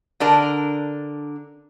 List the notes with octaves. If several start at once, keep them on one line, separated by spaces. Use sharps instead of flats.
D3 D4 A#4